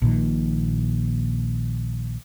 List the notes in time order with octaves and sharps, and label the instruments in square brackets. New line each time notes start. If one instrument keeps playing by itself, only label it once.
[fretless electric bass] A#1 A#2 D#3